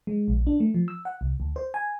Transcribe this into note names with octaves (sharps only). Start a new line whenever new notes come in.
G#3
A#1
D4
A3
F3
E6
F#5
C2
D2
C5
G#5